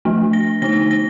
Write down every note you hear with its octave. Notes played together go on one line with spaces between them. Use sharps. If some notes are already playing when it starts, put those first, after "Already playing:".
F3 A3 D4
A#6
D3 A3 D#4 A#6
A#6